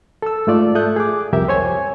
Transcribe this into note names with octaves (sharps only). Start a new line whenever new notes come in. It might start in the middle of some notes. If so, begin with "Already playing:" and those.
A4 E6
G#2 A3 F4 D5
A4 E5 D#6 F#6 G6
G#4 D6
C2 F2 G4 A#4 E5
C5 C#5 G#5